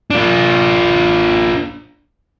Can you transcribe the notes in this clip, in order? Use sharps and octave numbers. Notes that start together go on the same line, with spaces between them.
D4 F4